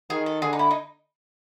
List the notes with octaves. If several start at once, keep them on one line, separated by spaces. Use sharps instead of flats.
D#3 G#4
A4
D3 G#4
D#4
E4
D#4